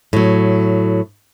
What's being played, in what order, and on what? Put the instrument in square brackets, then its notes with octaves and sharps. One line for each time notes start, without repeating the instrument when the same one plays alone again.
[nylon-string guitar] A2 F#3